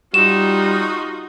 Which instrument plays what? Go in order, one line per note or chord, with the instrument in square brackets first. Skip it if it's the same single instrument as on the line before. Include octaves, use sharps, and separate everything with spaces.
[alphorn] G3 [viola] D#4 F4 [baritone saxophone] F#4 [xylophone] E7